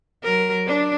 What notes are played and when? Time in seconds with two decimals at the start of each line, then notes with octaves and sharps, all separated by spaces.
0.23 F#3 A#4
0.66 D4